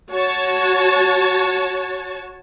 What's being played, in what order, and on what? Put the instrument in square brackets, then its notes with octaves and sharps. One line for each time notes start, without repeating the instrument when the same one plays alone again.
[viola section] F#4 C#5 A5